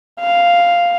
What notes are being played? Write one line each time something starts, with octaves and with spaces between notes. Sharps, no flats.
F5